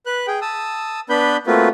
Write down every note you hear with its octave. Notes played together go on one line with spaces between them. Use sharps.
B4 F#6
G#4 G5
A5 D#6 E6
B3 D4 B4 B5 G6
A3 A#3 C4 F4 F#4 B4